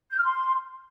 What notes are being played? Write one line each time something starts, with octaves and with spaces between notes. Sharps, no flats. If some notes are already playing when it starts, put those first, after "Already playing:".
G6
F6
C6